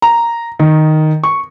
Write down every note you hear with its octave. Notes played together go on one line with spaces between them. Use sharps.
A#5
D#3
C#6